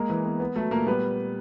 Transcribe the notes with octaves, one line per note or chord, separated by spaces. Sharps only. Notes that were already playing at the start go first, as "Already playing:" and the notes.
Already playing: G#3 A#3 A#4
E3
B3
B3
F#3 A3 A4
A#2 A#3 A#4
G3 B3 B4